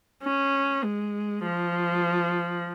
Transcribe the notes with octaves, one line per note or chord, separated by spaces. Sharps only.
C#4
G#3
F3